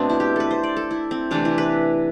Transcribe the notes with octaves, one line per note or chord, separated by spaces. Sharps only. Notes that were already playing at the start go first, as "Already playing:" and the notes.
Already playing: B2 A3 C4 D4
E4
G4
A4 B4
C5
D5
A4
E4
C4
C3 E3 A3 D4
E4
B4